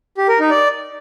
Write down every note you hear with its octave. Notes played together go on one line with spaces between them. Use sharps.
G4
A#4
D#4
D5